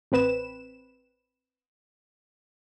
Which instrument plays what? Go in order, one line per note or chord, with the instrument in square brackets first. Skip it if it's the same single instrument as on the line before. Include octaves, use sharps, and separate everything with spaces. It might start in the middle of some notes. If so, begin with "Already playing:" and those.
[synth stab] A1 C4 B4 E7